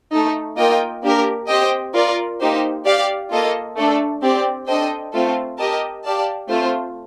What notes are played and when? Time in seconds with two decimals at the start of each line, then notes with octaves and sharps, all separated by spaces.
0.12 A3 D#4 A4
0.57 A#3 F4 A#4 D#5 G5
1.03 A#3 D4 G4 A#4
1.48 C4 G4 C5 D#5 G5
1.94 F4 A#4 D5
2.40 A#3 D#4 G4 C5
2.85 G4 D5 F5
3.31 A#3 F4 A4 D#5
3.76 A3 D4 A4
4.22 C4 G4 D5
4.67 D4 A4 C5 D#5 G5
5.13 A3 C4 F4 A4 C5
5.58 G4 A#4 D#5 A5
6.04 G4 D5 F5 A5
6.49 A3 C4 F4 C5